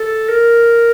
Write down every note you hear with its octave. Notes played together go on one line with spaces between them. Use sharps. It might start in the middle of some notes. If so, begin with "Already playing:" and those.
Already playing: A4
A#4